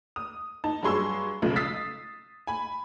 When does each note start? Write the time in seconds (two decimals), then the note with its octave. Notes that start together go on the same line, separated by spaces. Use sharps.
0.16 D#6
0.64 D#4 A5
0.83 G2 F#3 G#4 C6 C#6 E6
1.42 B1 C#3 F3 G#3 A3
1.56 D#6 E6 A6 B6 C7
2.47 G#5 B5